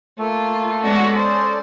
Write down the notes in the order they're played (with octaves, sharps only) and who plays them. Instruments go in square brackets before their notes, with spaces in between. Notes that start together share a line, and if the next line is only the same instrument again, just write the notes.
[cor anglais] A3 [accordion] A#3 [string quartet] F4
[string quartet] G#3 B3 F#4 [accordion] C#4 A4 D5
[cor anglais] G#3 [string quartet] C5